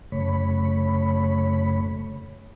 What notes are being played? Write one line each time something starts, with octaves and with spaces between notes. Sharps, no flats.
F#2 C#3 A3 C#5 B5